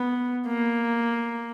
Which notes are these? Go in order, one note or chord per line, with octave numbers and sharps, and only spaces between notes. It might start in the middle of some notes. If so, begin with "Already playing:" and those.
Already playing: B3
A#3